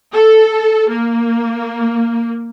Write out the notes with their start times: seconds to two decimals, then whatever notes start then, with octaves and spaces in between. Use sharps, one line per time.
0.12 A4
0.90 A#3